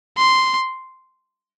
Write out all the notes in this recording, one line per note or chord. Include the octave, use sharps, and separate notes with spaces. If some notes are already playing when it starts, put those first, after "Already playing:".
C6